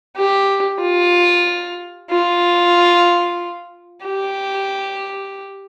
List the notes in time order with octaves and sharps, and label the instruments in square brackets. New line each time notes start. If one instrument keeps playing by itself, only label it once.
[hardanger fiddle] G4
F4
F4
G4